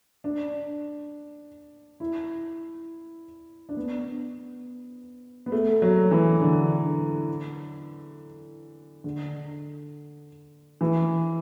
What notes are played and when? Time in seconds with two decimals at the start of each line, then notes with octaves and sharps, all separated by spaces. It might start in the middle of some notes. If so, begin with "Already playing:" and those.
0.24 D4
2.00 E4
3.69 D4
3.77 B3
5.46 B3
5.52 A3
5.82 F#3
6.11 E3
6.41 D3
9.04 D3
10.81 E3